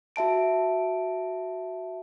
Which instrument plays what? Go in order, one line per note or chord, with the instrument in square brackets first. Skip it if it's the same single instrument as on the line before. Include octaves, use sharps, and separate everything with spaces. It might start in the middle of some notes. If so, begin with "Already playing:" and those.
[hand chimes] F#4 E5 A5 D7